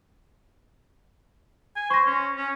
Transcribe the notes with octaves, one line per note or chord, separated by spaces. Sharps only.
G#5
C5 C#6 A#6
C#4
C#4